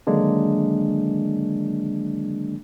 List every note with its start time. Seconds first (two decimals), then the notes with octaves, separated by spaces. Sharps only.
0.07 D3 D#3 F#3 G#3 A#3 D4